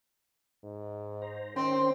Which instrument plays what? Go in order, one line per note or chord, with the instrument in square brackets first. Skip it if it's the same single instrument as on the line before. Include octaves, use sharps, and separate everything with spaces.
[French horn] G#2
[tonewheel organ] C5 A#5
[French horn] D#3 [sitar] C4 [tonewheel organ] C#4 G5 [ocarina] C6